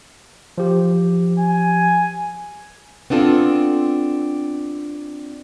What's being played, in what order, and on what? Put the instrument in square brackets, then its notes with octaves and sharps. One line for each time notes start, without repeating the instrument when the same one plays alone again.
[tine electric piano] F3 G4
[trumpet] G#5
[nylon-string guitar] B3 C4 D4 F4 A4